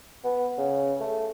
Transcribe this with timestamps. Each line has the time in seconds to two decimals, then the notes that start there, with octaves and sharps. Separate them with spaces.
0.24 B3
0.58 C#3
1.01 A3